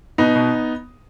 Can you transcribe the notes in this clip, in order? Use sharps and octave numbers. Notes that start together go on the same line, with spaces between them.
B2 B3 D#4
B2